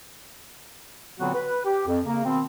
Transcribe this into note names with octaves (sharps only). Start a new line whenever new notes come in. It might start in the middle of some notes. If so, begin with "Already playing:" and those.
A#2 D3 F#3 B3 C4 F#4
B4
G4
F2
C#3 A#3
B2 D#3 B3 C4